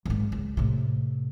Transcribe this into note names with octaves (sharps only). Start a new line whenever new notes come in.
G#1 G#2
C#2
A2 C3